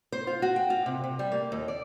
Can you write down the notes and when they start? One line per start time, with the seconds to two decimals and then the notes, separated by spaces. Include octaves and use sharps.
0.12 C5
0.27 F4
0.42 F#4
0.56 G5
0.70 F4
0.86 C3
1.04 C3
1.19 G3
1.32 A#3
1.52 D#2
1.68 D5